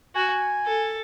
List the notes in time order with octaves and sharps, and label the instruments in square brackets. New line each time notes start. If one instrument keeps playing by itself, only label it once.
[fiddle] F#4 [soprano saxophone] G#5
[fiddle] A4